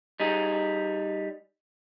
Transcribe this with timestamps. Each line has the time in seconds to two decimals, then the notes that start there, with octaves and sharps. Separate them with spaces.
0.20 G3 D#4 G#4